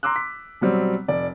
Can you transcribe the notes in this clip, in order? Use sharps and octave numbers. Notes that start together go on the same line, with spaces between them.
A#5 C6 D6 E6 F#6
B6
B2 F#3 G3 C4
F1 D5